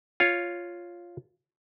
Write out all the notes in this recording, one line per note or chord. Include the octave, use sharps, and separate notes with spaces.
F4 C#5